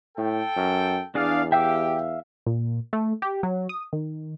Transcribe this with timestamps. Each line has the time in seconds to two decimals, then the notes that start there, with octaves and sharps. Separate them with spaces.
0.18 A2 A4 G5
0.56 F#2
1.15 E2 D4 G#4 D5 F5
1.52 G4 E5 F5 G5 E6
2.47 A#2
2.93 A3
3.22 G4
3.43 F#3
3.69 D#6
3.93 D#3